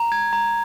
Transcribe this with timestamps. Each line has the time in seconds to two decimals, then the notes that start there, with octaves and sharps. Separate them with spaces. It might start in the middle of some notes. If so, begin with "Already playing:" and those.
Already playing: A#5
0.12 G#6
0.33 A#5